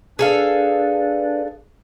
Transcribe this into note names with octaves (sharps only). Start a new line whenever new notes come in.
D4 G#4 A4 B4 D5 F5